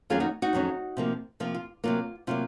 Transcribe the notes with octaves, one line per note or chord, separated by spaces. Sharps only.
F2 D#3 F#3 A#3 C#4 F4 G#4
D#4 F#4
D#4 F#4
F2 D#3 F#3 A#3 C#4
C3 F3 A#3
C3 F3 A#3 F4
F4
C3 F#3 A#3 F4
C3 F#3 A#3 F4